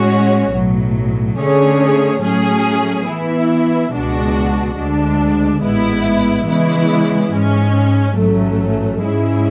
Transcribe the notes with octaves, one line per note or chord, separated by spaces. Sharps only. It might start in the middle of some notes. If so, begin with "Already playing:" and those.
Already playing: A2 G#3 C#4 F#4 C#5
B1 A2 F#3
D3 A3 C#4 G#4 C#5
A2 F#3 A3 C#4 G#4
E3 B3 E4
C#2 B2 G#3 D4 F#4
D2 D3 G#3 D4
A1 G#2 G#3 B3 E4
C#3 E3 G#3 B3 E4
G#2 G#3 C#4
A1 G#2 F#3 A3 C#4
G#2 G#3 C#4 E4 G#4